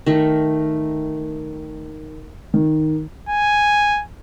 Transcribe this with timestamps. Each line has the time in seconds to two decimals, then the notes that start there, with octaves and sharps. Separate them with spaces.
0.06 D#3 A3
2.54 D#3
3.29 G#5